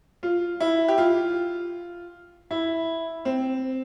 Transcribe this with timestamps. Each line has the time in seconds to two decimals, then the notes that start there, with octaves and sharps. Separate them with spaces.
0.23 F4
0.60 E4
0.88 G4
0.98 F4
2.51 E4
3.25 C4